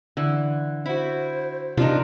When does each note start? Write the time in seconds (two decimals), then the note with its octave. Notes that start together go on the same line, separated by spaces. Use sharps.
0.17 D3 E3
0.86 E4 F#4 C5
1.77 C3 F3 D4 D#4 F4 A#4